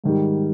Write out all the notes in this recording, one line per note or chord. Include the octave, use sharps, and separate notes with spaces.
G#2 D#3 G3